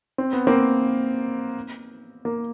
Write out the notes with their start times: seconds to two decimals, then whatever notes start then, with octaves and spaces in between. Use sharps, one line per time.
0.18 C4
0.33 B3
0.47 A#3 C4
2.25 A#3